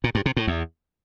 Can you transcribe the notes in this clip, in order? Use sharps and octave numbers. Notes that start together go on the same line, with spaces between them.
A#2
G2
C3
A2
E2